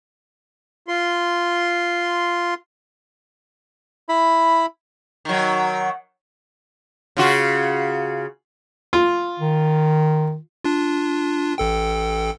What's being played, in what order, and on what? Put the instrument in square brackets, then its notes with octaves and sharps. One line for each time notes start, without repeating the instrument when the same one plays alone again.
[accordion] F4 C6
[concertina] E4 B5
[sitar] D#3 F#3
C#3 F4 F#4
[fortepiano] F4
[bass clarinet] D#3
[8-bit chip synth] D4 F4
A1 A4 G5